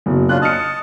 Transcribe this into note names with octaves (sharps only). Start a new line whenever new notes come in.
F#1 B2
C#4 D4 F4 F#6
D#5 A5 D#6 F6 C#7